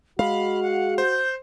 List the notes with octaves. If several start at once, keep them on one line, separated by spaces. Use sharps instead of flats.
G#3 F#4 F5 B5
F#5
C5 G6